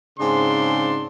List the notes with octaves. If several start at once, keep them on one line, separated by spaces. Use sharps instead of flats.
G#2 C#3 C4 D4 C6